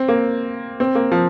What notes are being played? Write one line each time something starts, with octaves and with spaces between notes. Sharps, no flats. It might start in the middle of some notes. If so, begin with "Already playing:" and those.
Already playing: C4
A#3
C4
A#3
F3